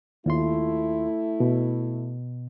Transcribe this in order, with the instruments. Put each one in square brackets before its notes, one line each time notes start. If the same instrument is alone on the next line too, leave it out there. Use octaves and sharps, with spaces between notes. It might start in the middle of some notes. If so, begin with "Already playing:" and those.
[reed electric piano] D#2 F4 C6 [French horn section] A3 E4
[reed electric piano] B2